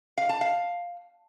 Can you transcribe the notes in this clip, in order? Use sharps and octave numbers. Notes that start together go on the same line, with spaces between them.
F5
A5
F5